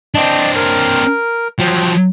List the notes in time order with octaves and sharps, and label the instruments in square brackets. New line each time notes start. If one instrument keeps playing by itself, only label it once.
[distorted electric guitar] C4 D4 [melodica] D5 D#5 A5
[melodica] A#4
[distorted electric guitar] F3 F#3 [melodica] G5